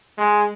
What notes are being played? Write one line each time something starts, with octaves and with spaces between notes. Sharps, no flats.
G#3